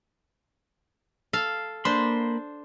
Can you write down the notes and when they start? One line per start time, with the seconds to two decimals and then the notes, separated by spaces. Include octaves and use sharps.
1.33 A4 F5
1.85 A#3 D4 C5 B5 C6